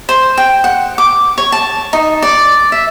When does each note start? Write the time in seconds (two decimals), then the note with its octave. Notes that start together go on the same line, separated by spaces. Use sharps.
0.09 C5
0.38 G5
0.64 F#5
0.98 D6
1.38 C#5
1.52 A5
1.93 D#4
2.22 D5
2.72 E5